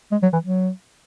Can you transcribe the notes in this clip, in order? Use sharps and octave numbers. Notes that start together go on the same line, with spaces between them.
G#3
F#3
E3
F#3